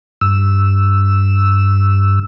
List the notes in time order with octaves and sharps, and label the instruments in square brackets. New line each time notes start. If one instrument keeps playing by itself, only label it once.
[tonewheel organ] G2 E6